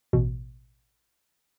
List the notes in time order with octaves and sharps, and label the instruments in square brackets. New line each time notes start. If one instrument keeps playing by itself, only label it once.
[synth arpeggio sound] A1 B2